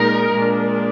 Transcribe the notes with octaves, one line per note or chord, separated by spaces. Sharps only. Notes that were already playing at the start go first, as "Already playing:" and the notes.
Already playing: A#2 G#3 D#4 A#4
A#2 G#3 D4